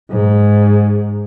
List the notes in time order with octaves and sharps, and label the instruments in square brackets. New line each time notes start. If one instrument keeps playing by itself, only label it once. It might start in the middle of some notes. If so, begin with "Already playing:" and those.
[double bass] G#2